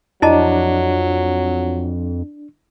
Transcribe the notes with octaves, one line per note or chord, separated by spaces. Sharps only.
F2 F#3 D4 E4 D#5 A5